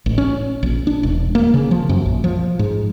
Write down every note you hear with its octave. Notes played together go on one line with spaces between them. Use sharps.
A1
C#4
A#1
D4
E1
A#3
C#3
F3
F#2
A#1
F3
G#2